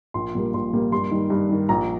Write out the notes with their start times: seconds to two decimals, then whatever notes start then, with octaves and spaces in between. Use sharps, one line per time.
0.14 A#1 C6
0.35 A#2 G3 A#3
0.54 A#1 C6
0.73 A#2 G3 A#3
0.92 G2 C6
1.11 D#3 G3
1.30 G2
1.49 D#3 G3
1.69 A#1 A#5